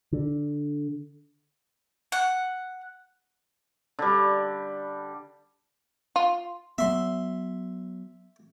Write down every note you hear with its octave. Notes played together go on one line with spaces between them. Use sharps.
D3
F#5
D3 G3
F4
F#3 B3 E5 C6